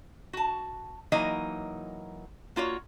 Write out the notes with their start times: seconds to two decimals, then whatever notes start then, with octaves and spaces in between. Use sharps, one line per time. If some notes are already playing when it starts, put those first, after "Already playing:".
0.33 F#4 A5
1.12 E3 F#3 A#3 D#4 D#5
2.56 A#3 F4 F#4 C#5